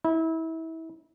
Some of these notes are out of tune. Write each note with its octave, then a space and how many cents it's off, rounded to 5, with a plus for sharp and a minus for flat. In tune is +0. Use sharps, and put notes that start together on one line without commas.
E4 -30